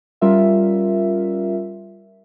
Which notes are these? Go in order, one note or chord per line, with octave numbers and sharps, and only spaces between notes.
G3 C#4 F4 A#4 E5